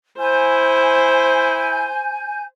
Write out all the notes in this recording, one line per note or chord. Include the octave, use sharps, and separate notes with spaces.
E4 C5 G#5 G6